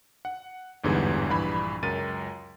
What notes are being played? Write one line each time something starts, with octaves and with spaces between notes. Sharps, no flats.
F#5
G1 E2 G#2 D3 E3 G3
A#1 G2 E3 B5
C#2 F#2 A#4 A6 D#7